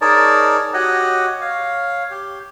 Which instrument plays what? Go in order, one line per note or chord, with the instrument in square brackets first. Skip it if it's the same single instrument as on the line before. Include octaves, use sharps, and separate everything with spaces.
[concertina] D#4 G#4 A#4 C#5 D5 A5
F#4 G4 C#5 D#5 F#5
C#5 F5
G4